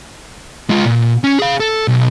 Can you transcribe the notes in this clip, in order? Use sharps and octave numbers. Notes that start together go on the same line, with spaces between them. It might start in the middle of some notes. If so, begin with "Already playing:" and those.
G#3 F4
A#2
C#4
G#4 F5
A4
B1